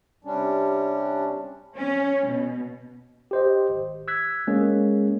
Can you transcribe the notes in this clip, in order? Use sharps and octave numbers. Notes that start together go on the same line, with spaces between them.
C3 G3 C#4 D4
C#4
B2
G4 C5 D#5
G#1
E6 F#6 G#6 B6
G#3 A#3 C#4 G#4